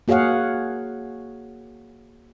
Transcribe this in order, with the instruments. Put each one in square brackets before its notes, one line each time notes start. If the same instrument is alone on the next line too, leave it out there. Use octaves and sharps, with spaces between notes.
[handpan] A#3 F#4 G#4 C#5 F5 F#5